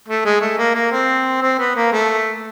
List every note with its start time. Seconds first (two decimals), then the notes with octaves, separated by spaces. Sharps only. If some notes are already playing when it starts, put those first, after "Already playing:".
0.08 A3
0.25 G#3
0.41 A3
0.58 A#3
0.74 A#3
0.92 C4
1.42 C4
1.59 B3
1.76 A#3
1.93 A3